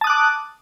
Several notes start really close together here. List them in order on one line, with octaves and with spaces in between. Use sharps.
A5 D#6 F#6 D6